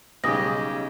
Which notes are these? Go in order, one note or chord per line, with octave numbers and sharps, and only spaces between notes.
B1 C#3 G3 G4 D#6 A#6